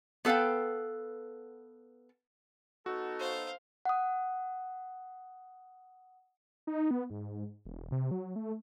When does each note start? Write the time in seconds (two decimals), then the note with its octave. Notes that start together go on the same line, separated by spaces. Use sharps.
0.25 B3 A4 B4 F5 G5
2.86 B3 D#4 F#4 A4
3.20 C5 F5
3.85 F#5 D#6
6.67 D#4
6.91 B3
7.10 G#2
7.66 E1
7.92 C3
8.11 F#3
8.36 A3